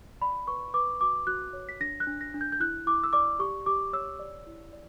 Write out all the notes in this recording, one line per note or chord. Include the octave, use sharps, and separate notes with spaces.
D5 B5
B4 C#6
B4 D6
F#4 D6
F#4 F#6
C#5
B6
D4 A#6
F#6
D4
A#6
D4
G6
G6
E4 F#6
E4 D6
E6
D5 D6
G4 C#6
G4 D6
C#5 E6
D5
E4
D5